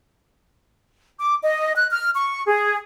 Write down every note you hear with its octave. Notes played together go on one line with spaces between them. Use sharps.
D6
D#5
F#6
F6
C#6
G#4